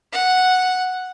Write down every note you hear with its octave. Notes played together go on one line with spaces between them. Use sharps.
F#5